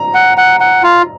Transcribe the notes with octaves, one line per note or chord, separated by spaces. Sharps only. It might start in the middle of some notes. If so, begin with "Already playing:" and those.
Already playing: A#5
F#5
F#5
F#5
F4